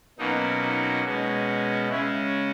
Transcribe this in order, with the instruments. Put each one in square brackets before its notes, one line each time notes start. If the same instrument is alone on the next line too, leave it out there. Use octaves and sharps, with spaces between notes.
[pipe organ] B2 F#3 A#3 C#4 D#4
D#4
B2 G#3 C#4
C#3 G#3 C#4 E4